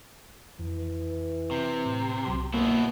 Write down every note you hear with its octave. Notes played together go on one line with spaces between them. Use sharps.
F2 E3
C3
A2
C2 F#3 C6
G1 B2 A#3 B3 E4